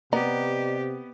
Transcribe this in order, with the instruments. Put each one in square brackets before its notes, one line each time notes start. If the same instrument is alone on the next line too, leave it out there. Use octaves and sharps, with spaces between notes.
[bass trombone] C3 [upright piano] B3 [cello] G4 [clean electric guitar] D5 D#5 A#5